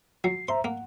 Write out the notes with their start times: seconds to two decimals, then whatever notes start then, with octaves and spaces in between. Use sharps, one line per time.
0.24 F#3 C7
0.48 C5 E5 A#5 C6
0.64 A#3 F#5